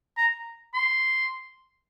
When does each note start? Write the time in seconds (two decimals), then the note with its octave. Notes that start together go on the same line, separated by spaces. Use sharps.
0.17 A#5
0.74 C6